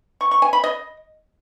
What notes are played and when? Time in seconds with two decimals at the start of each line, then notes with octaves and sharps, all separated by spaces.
0.21 C#6
0.31 C#6
0.42 G#5
0.53 B5
0.64 D#5